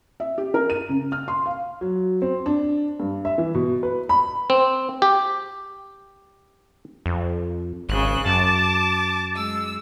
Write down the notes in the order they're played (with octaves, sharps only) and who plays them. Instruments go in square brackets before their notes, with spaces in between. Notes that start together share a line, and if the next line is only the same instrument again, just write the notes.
[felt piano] E5
G4
A#4
D#7
C#3
F6
C6
F5
[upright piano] F#3
C4
D4
G2
E5
E3
B2
B4
B5
[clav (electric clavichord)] C4
G4
[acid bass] F2
[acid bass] G#1 [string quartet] C#3 F#6
[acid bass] F#2 [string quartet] A5 D6
[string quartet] G#3 E6